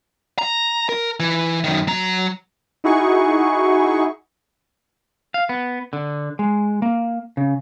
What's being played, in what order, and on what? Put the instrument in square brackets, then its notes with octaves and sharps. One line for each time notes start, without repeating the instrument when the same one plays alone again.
[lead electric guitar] A#5
A#4
E3
F#2 D#3
F#3 A#5
[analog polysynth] D#4 E4 F#4 G#4 C#6
[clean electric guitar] F5
B3
D3
G#3
A#3
C#3